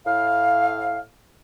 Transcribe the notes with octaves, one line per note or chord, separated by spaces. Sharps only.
A2 F5